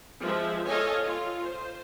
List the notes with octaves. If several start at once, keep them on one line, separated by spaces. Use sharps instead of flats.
F3 G#3 E5
A4 C#5 D#5 F5 G#5
F4
C5